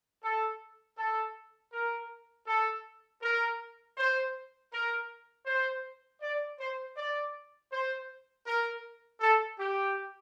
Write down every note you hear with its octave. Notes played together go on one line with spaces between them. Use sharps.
A4
A4
A#4
A4
A#4
C5
A#4
C5
D5
C5
D5
C5
A#4
A4
G4